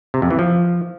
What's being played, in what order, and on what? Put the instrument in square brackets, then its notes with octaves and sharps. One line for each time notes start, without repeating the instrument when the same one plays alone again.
[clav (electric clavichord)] C3
F2
E3
F3